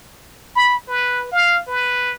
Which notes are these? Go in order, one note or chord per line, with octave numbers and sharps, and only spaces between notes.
B5
B4
F5
B4